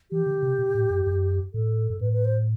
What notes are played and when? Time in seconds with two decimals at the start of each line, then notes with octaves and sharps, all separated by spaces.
0.11 E3 G4
0.26 D3
0.43 C3
0.59 B2
0.75 A2
0.90 F#2
1.07 F#2
1.54 A2 A4
1.90 G2
2.01 A2 B4
2.13 B4
2.25 C5